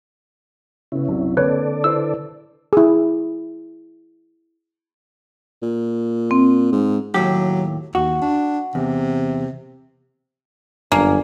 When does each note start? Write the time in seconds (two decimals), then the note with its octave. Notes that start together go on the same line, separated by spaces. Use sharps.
0.92 C#3 B3 C#4 E4
1.08 C2 F#2
1.37 D3 A#3 C4 A4 B4 C#5 D5
1.84 E4 B4 C5 E6
2.73 E4 G#4
5.62 A#2
6.31 C4
6.72 G#2
7.14 D#2 A2 F#3 G4
7.95 D#2 F#4
8.22 D4
8.75 E2 C3
10.92 G1 F#2 A#3 D4 G#5